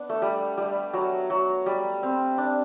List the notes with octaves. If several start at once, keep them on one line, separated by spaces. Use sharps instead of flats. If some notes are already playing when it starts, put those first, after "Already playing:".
Already playing: B3 D4
A3
G3
G3
F#3
F#3
G3
C4
D4